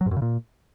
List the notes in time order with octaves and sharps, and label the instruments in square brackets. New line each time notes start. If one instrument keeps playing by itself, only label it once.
[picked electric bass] F#3
G#2
F#2
C#3
A#2